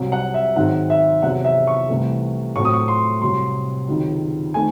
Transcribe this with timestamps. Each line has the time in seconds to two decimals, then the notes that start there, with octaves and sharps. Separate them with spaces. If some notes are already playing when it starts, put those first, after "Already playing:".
Already playing: C2 C3 F#3
0.12 F#5
0.34 E5
0.56 G#2 D#3 F#3 C4 F#5
0.90 E5
1.22 E2 C3 F#3 C4 F#5
1.45 E5
1.67 C#6
1.89 C2 C3 E3 A3 C4
2.56 A2 F#3 A3 C4 C#6
2.65 D#6
2.74 C#6
2.88 C6
3.22 C2 C3 F#3 C6
3.88 C#2 C3 D#3 F#3
4.54 D#3 A3 C4 G#5